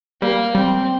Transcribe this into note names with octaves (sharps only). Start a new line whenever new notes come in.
G3 A#3
G3 C4